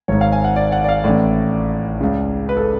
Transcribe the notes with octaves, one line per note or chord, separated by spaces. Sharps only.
G#1 G#2 C#5
F5
G#5
F#5
D5
F#5
D5
F5
A1 A2 D5
C#2 C#3
B4
A4